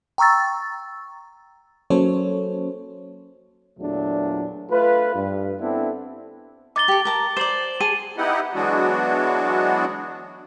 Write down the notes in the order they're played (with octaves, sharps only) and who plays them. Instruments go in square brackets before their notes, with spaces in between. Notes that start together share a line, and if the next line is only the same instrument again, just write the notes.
[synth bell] G5 A#5 C#6 E6 A6
[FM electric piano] F#3 A#3 C#4 A4 C5 C#5
[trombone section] E2 A#2 F#3 A3 D4
A3 F4 B4
G2
B3 C4 D4 E4 A4
[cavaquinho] D#4 [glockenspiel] D6 A6 G7
[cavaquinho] G4 A4
A#4 A5 A#5
[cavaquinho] C5 D5 [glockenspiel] E7 F#7
[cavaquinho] G#4 A5 C6 [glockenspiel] D#7
[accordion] B3 D#4 E4 G4 F#5
E3 F#3 G#3 B3 D4 F#4